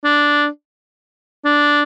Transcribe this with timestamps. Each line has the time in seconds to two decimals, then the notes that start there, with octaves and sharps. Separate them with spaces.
0.04 D4
1.45 D4